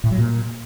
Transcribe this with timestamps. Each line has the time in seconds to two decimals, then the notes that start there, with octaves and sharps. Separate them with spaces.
0.04 A2
0.11 F#3
0.18 A#2